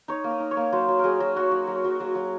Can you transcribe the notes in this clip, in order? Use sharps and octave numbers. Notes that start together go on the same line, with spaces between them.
D#4 C#5
A#3
D#5
D#4
C#5
A#3
F#3 C5
F#3
F#3 G#4 A#4
F#3
F#3 F#4
F#3
F#3
F#3
F#3
F#3